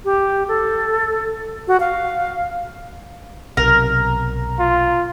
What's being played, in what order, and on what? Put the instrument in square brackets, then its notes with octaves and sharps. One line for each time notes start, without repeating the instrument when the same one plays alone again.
[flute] G4
A4
F#4
F5
[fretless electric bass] B1 C3 [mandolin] A#4
[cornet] F4